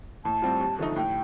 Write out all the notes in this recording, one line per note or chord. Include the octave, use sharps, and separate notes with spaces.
A2 A5
G3 C4 F4
D#2
D3 F3 A3 D#4
A2 G5